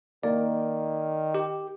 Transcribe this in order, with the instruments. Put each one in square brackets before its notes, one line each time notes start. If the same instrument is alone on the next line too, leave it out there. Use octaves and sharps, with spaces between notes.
[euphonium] D#3 [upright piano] A#3 [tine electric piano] D5
[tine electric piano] G4